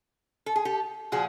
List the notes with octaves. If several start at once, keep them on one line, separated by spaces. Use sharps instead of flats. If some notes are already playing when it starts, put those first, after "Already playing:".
A4
G#4
G4 A4
A#2 F3 F#4 G#4